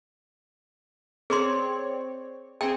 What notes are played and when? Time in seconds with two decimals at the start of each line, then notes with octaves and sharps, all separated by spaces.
1.30 C4 G#4 C#5 D5 C6
2.61 C4 G#4 G5